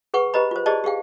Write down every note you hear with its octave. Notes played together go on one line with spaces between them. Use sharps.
G#4 B4 F#5 C#6
G4 B4 C5 D#5 A#5 B5
F4 C5
G4 G#4 C5 D5 D#5 A5
G4 G#4 F5 G5